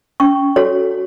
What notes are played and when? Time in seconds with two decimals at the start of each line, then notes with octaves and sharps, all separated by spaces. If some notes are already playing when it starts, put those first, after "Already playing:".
0.20 C#4 C#6
0.56 F#4 A4 C#5